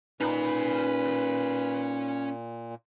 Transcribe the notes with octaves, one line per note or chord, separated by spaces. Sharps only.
A#2 C#4 D#4 B4 B5